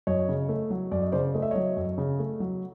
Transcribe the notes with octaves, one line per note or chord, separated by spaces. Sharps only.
F#2 C#5 D#5
C#3
A3
F#3
F#2 D5
D#5
C#3 C5 D5
A3 D#5
E5
F#3 C#5 D#5
F#2
C#3
A3
F#3